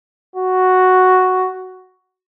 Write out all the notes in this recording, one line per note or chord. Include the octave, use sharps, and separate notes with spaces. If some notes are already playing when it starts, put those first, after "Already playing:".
F#4